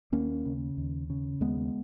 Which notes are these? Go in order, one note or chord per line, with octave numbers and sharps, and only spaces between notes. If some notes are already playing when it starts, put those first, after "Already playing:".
D#2 A#3 C#4
C#3
D#2
C#3
D#2 G#3 B3